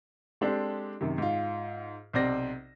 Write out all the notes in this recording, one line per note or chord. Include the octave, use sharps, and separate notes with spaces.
G#3 C4 D4 G4 A4
F#2 C3 D#3
G#2 F4
B1 C3 C4 D5 A#6